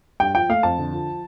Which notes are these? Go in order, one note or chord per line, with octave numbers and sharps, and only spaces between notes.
G2 G5
F3 G5
A3 F5
F2 A5
D3
F3